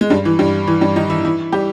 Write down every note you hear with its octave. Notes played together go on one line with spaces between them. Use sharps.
G#3
G2 G3
E3
G2 G3
E3
G2 G3
D#3 D#4
E3 E4
E3 E4
G3 G4